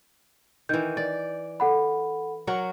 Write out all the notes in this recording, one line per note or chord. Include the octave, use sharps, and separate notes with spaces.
D#3 E3 G6
D5
A4 F#5 B5
F#3 F#4 A#4